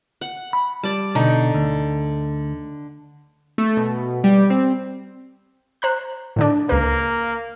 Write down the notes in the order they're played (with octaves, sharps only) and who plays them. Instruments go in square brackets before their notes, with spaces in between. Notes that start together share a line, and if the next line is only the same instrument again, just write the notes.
[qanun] F#5
[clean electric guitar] B5
[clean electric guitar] G3 [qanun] D5 A5
[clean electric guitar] B2 [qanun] D3 D#4
[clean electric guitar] D2
[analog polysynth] A3
B2
G3
C4
[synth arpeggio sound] C5 A#5 F#6
A2 D3 D4
[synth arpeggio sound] C#2 B4 [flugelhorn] A#3